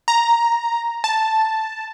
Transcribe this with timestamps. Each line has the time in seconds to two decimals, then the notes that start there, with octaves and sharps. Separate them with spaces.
0.08 A#5
1.04 A5